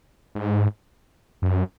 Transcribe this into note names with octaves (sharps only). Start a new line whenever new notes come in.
G#2
F#2